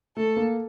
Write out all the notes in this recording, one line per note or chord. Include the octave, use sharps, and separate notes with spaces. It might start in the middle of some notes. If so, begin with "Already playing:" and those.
A3 A4
A#3